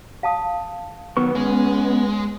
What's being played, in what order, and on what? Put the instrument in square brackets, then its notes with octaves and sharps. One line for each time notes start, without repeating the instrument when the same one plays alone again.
[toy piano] F5 A5 D#6
[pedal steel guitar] D#3 F#3 C#6 [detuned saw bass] B3 [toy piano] B4
[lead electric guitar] G#3 [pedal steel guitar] C#4